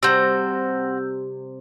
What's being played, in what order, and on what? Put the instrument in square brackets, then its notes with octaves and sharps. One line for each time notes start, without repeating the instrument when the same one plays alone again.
[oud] C3 G3 [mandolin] C4 F#4 [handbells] E6 G6